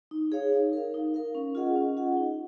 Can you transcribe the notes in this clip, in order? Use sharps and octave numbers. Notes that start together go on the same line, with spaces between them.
D#4
G#4 C#5 F5
D#4
A#4 F5
D#4
A#4 F5
C#4
F4 G#4 D#5 F#5
C#4
F4 G#4 D#5 F#5
D#4